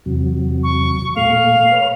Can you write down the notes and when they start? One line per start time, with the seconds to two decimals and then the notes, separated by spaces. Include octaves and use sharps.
0.06 E2 C3 F#3
0.63 C#6
1.17 A#2 A3 F5 F7
1.72 B4 C#5